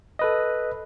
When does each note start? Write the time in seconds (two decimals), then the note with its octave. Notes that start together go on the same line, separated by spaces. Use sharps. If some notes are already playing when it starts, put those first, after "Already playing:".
0.19 A4 B4 D#5